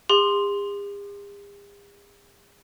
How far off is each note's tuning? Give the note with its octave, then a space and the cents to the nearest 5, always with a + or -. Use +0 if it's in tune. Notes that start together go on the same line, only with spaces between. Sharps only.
G#4 -45 C6 +0